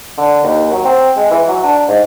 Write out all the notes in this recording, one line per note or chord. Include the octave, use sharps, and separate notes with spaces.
D3
D#2
F#3
C4
G#3
E3
F#3
D4
G#2